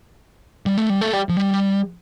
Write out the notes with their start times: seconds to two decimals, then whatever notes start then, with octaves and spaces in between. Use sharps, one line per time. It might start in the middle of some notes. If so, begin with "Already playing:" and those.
0.66 G3
0.77 A3
0.90 G3
1.01 A3
1.13 G3
1.29 F3
1.37 G3